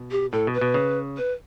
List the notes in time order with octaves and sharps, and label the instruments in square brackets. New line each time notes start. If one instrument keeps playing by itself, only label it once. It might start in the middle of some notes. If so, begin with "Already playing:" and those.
Already playing: [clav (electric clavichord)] B2
[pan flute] G4
[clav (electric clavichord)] A2 [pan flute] A4
[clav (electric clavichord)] B2
[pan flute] B4
[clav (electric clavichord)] B2
C#3
[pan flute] B4